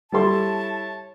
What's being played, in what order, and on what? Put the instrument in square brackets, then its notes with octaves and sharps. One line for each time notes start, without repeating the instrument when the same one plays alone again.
[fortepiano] G3 A4 C6 [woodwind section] E4 C#5 A5